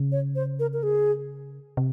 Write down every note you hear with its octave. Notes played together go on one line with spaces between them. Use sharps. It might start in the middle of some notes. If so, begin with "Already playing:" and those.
Already playing: C#3
C#5
C5
A#4
A#4
G#4
C3